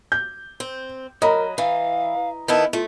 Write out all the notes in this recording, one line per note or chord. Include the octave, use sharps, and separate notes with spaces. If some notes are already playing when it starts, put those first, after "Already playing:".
G6
C4
F#3 A#4 D#5 A#5 B5
E3 F5
D#3 B3 E4 A5
A3 F4